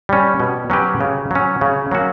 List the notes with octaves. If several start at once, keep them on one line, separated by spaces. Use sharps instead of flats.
G3 C#4
B2
F#3 C#4 G4 B4
C#3
F#3 C#4
C#3
F#3 A#3 C#4 F#4